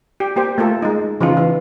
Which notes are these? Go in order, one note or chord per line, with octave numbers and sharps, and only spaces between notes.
G4
A#3 G4 C5
A3 A#3 F4 A4
G#3 D#4
C#3 E3 F3 D#4 F4
E3